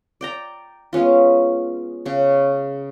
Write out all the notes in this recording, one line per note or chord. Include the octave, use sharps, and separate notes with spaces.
D5 G5 A#5
G#3 B3 C#4 F4
C#3 C#5